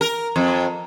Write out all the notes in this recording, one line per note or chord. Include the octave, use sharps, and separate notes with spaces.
A#4
F2